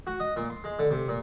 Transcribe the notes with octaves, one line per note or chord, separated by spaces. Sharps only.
F#4
D#5
A#2
C6
G#3
D3
C3
A#2